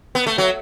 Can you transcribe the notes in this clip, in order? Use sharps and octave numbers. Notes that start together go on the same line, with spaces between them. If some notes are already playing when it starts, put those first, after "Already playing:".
B3
A3
F#3